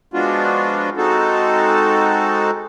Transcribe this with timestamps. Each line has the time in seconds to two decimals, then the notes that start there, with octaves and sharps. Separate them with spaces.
0.14 F3 G#3 B3 D4 F4 F#4
0.97 G#3 C4 D#4 F#4 A4